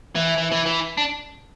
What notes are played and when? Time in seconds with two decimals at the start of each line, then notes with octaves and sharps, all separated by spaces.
0.16 E3
0.38 E3
0.52 E3
0.66 E3
0.98 D4